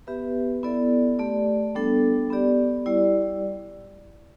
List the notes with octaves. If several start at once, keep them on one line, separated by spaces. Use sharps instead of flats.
B3 G4 B4 E5
B3 E4 A4 D5
A3 G4 D5
G3 B3 D4 A4
B3 G4 D5
G3 E4 G4 D5